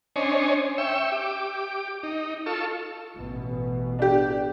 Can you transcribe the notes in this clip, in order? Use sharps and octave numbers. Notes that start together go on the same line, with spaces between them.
C#4 D4 C5 C#5 D#5 G#5
E5 G5 C#6 E6
G4 D6
D#4
F4 A4 C#6 E6
A1 B2
D4 G4